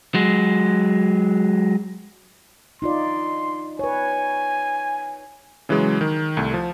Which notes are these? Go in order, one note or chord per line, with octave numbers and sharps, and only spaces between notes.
F#3 G#3
D#4 F4 D5 C6
B4 C#5 G#5
C#3 E3 F#3 G#3
D#3
C2 A3
F3